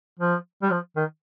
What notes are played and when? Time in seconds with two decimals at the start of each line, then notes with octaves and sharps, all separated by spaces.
0.20 F3
0.62 G3
0.71 F3
0.96 D#3